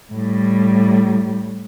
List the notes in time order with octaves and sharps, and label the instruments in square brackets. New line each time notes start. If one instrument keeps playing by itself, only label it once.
[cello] A2 G3